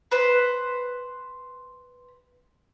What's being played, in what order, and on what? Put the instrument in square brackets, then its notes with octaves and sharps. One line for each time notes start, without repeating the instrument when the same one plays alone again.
[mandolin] B4 C5